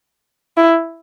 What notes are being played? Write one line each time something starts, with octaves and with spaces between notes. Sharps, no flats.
E4